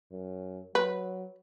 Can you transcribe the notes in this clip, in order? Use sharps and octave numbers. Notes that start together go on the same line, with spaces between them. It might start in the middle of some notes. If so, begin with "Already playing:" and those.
F#2
F#3 B4